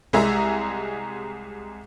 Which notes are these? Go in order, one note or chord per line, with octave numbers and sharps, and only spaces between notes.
C2 G#3 G#4 E5 A#5